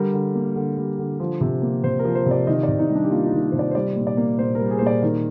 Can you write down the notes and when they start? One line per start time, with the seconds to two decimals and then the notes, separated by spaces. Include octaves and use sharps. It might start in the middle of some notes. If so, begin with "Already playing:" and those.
Already playing: D3 G3 A#4
0.14 D3
0.35 A#3
0.56 D3
0.77 G3
0.99 D3
1.20 F3
1.41 C3
1.62 A#3
1.84 C3 C5
1.99 A#4
2.05 F3
2.15 C5
2.26 C3
2.31 D5
2.47 D#3 D#5
2.63 D5
2.69 C3
2.79 D#4
2.90 G3
2.95 D4
3.04 G4
3.11 A#3 F4
3.26 D#4
3.33 D#3
3.43 F4
3.52 C3 C5
3.59 D5
3.71 C5
3.75 G3 D5
3.96 A#2
4.07 D5
4.17 A#3
4.39 A#2 C5
4.55 A#4
4.60 G3
4.70 G#4
4.79 A#2 C5
4.87 D5
5.02 D#3 A#4